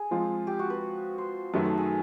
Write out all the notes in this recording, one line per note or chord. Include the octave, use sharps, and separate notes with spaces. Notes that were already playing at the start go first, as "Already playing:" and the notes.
Already playing: G#4
F3 G#3 C4 F4
G4
F#4
B4
C5
F#2 D#3 F#3 A3 B4
A4
G#4